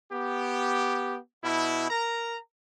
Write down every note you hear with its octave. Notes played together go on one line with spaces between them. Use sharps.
B3 G4
B2 E4
A#4 A#5